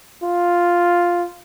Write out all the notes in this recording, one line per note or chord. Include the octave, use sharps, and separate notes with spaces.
F4